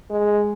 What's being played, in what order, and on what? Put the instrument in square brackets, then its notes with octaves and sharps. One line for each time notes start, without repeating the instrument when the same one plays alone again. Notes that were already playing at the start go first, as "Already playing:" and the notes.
[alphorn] G#3